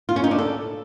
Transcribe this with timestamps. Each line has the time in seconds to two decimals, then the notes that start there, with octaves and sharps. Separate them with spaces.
0.09 F4
0.16 C#4
0.24 D#4
0.31 D4
0.39 A4